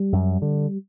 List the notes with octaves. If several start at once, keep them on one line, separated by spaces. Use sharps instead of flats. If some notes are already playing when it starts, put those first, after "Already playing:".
Already playing: G3
F#2
D3